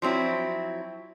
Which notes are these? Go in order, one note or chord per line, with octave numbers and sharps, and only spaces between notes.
F3 F#3 C4 E4